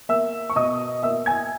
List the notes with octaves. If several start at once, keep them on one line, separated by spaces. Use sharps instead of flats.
A#3 E5 E6
C#6
B2 D#5 D#6
A#3 E5 E6
G#5 G#6